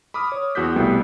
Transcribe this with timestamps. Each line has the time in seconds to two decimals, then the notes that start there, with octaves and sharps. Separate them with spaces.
0.14 B5 D6 D#6 F6
0.32 C#5
0.55 E2 F#4 D#6 F#6 G6 B6
0.76 C2 B2 G3 A3 B3 G5